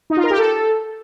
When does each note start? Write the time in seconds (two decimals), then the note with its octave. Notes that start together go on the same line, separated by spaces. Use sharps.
0.10 D#4
0.17 F4
0.24 A#4
0.30 G4
0.37 A4